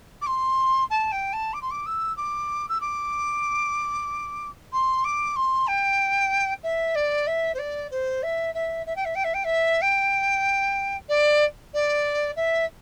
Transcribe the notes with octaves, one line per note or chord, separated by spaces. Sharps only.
D6
C6
A5
G5
A5
D6
C6
D6
E6
D6
E6
D6
C6
D6
C6
G5
E5
D5
E5
C5
D5
C5
E5
E5
E5
G5
E5
G5
E5
G5
E5
G5
D5
D5
E5